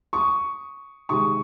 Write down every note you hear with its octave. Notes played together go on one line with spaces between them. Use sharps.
C#6 D#6
C3 D#3 G#3 C#6 D#6